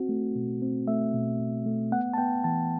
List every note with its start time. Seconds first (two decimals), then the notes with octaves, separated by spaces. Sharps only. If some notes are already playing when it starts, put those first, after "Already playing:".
Already playing: C4 F#4
0.09 A3
0.35 B2
0.62 C4
0.88 A3 E5
1.13 B2
1.39 B2
1.66 A3
1.92 B3 F#5
2.14 A5
2.18 B3 G5
2.44 E3 A5